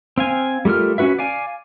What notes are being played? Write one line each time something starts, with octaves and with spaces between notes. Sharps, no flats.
C4 F5 G#5
G3 A3 F4 A#4 F6
C#4 D4 F#4 B4 E5
D5 F5 G#5